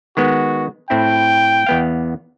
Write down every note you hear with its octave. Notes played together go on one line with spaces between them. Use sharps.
D#3 G#3 B3 F#4
A2 C4 E4 G5
E2 B3 F5